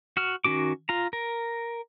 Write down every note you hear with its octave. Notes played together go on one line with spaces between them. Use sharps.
F#4 F6
D#3 C#4 F#4 D6
F4 A#5
A#4